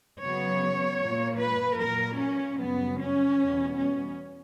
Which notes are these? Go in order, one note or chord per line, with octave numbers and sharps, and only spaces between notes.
C#3 F#3 B3 C#5
A#2 A#3
B4
A#2 F#3 A#3 A#4
C#4
F#2 C#3 G3 B3
C#4
E2 B2 G3 B3
C#4